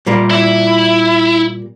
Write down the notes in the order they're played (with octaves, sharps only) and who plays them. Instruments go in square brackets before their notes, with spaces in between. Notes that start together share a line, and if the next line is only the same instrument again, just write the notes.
[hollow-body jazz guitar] A#2 G3 A#3
[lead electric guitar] E4